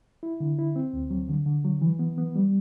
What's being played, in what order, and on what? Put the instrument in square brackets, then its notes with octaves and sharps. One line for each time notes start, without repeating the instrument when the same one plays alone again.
[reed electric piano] E4
D3
E4
C4
D2
F#3
D3
D3
F#3
E3
B3
B3
G3